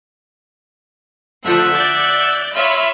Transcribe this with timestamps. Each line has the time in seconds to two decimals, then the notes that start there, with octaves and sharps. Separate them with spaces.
1.46 D3 F3 A3 E5 F#5
1.75 D5 G6
2.55 F4 C#5 E5 B5